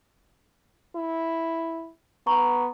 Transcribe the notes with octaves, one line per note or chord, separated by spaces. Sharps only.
E4
B3 A#5 C#6